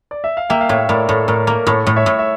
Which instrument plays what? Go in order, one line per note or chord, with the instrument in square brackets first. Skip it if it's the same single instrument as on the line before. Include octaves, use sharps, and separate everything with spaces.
[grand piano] D5
E5
F5
[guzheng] A#3 [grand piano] E5 G5
[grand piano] F5
[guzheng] A2 [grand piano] C#5 E5
[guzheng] A2 [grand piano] A#4 D5
[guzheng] A2 [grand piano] A4 C#5
[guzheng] A2 [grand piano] A#4
[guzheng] A#3 [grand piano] A#4
[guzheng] A2 [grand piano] A4 C#5
[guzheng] A2
[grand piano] C#5 E5
[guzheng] A2
[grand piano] E5